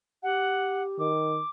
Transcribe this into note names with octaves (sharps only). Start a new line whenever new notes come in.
G4 F#5
D#3 D6